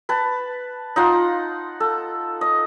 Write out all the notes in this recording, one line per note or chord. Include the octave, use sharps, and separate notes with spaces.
B4 A5
D#4 F4 F#5 C6
A4
D#5